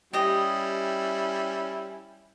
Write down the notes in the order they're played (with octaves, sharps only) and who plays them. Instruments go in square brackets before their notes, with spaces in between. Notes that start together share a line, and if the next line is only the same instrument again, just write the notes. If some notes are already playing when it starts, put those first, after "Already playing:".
[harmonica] G3 C#4 E4 [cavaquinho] G4 D#5